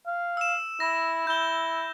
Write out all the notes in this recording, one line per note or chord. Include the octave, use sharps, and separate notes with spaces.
F5
E6 E7
E4 A#6
E4 G6 G7